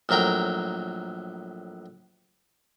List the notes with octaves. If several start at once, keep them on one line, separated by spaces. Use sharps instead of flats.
A#1 A2 F#3 A#4 G5